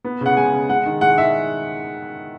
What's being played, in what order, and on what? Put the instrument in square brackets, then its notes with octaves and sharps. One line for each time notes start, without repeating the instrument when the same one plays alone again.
[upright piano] B3
C#3 F#5
G#3 G#5
C#3
G#3 F#5
D#3
G#3 F#5
D#3 E5